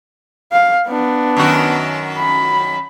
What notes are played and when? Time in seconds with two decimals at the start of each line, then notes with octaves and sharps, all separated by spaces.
0.52 F5
0.87 B3 D4
1.37 F#2 D#3 F#4
2.18 B5